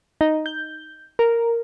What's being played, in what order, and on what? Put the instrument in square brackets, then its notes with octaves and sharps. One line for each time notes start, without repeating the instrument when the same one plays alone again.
[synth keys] D#4
G6
A#4